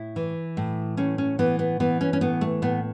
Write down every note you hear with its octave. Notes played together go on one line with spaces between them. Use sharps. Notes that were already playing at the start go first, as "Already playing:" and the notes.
Already playing: A2 E4
E3
A2
A2 C#4
C#4
E3 B3
B3
E3 B3
C#4
C#4
A2 B3
A3
A2 B3